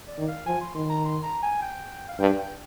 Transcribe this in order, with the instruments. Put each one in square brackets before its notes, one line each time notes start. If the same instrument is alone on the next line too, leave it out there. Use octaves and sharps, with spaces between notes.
[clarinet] D5
[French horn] D#3
[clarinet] F5
[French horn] F3 [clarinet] G#5
[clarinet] C6
[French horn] D#3 [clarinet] C6
[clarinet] A#5
C6
A#5
G#5
G5
F5
[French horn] G2 [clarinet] G5
[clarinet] G5